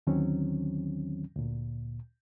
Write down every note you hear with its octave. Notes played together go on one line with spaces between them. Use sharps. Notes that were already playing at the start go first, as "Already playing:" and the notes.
D#2 D3 D#3 F#3 C4 C#4
D2 A#2